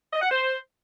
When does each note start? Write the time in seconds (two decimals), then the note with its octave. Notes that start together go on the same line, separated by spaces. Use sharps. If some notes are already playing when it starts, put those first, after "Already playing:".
0.13 D#5
0.21 F#5
0.29 C5